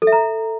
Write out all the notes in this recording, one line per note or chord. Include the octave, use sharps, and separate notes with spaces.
A4
E5
A#5